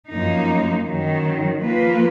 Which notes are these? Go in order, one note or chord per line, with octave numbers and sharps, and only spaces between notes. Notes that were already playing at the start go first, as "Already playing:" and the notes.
F#2 F3 A#3 D#4
F#2 D#3 F#3
F3 A#3 F4 B4